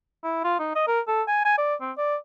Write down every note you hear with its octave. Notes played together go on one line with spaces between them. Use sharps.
E4
F4
D#4
D#5
A#4
A4
G#5
G#5
D5
C4
D5